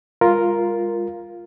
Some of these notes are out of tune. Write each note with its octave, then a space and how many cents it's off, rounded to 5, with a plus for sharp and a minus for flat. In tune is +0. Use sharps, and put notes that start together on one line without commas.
G#3 -40 F4 +0 A#4 +5